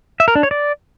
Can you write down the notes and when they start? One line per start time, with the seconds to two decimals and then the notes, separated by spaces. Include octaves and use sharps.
0.20 E5
0.28 A#4
0.35 D4
0.43 C#5
0.51 D5